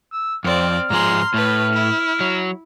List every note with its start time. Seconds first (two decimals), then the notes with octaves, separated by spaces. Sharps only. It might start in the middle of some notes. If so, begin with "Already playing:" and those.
0.12 E6
0.44 F2 C4 D5 F6
0.90 G#2 F3 G#4 A#5 C6
1.34 A2 A3 B4
1.72 E4
2.21 F#3